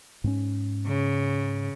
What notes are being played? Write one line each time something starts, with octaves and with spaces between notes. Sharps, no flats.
G#2 C4 C#4
C#3